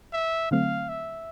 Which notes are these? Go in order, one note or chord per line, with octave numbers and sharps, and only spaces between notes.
E5
D3 F#3 A3 C4 F5
E5